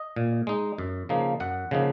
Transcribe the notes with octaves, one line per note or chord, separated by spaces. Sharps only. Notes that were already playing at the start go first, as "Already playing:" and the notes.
Already playing: D#5
A#2
G#3 D#4
F#2
C#3 F3 A#3 D#4
F#2 F#5
C#3 F3 A#3 D#4